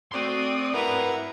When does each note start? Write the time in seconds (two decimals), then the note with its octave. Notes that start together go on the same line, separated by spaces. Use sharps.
0.12 A3 C4 F#4 D5 C6 D#6
0.74 G3 E4 A#4 B4 F#5 A#5